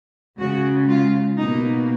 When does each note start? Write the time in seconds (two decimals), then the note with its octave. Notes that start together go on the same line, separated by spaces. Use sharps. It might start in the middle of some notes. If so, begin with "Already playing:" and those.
0.39 C#3 G#3 F#4
0.88 F4
1.38 B2 A#3 D#4